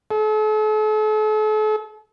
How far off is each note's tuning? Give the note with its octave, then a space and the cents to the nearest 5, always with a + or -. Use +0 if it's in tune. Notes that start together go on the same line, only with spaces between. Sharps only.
A4 -40